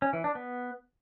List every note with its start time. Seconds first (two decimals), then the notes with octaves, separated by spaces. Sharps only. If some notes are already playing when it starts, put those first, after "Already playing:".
0.02 C#4
0.13 E3
0.24 D4
0.35 B3